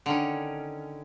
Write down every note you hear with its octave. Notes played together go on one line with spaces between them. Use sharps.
D3 D#3 C#4